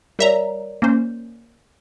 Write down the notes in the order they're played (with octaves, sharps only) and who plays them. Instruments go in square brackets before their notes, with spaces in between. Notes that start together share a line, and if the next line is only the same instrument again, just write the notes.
[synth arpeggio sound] G3 E5 A#5 [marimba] A#4 C#5 D5
[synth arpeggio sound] A#3 C#4 C5